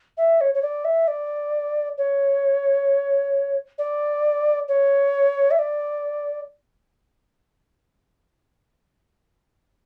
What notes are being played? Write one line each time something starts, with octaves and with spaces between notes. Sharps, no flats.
E5
C#5
C#5
D5
E5
D5
C#5
D5
C#5
E5
D5